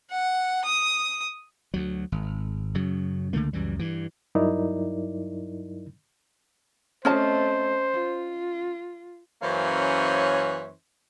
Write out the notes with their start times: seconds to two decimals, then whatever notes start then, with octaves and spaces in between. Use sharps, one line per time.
0.11 F#5
0.65 D#6
1.74 D2 F#3
2.12 G#1
2.75 F#2 C#3 F#3
3.33 C#2 D3 A3 A#3
3.53 C#2 F#2 E3 G3
3.79 G2 E3
4.35 G2 F#3 D#4 E4 A#4 D5
7.05 A3 C4 C#4 C5 D#5 A5
7.93 F4
9.42 F#2 E3 A#3 C#4 C5 C#5